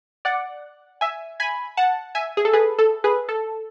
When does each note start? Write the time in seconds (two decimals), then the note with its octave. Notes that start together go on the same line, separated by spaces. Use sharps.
0.25 D5 F#5
1.01 E5 G#5
1.40 G#5 B5
1.77 F#5 A5
2.15 E5 G#5
2.37 G#4
2.45 A4
2.53 G#4 B4
2.79 A4
3.04 G#4 B4
3.29 A4